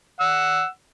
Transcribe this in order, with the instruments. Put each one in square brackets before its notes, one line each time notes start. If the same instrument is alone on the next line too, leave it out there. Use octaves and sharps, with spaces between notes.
[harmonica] F#5 E6